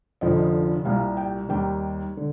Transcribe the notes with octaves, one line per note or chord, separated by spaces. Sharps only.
F1 F2 D3 F3 D#5
C2 A#2 G3 F5
G5
D#2 D#3 G3 G5
D3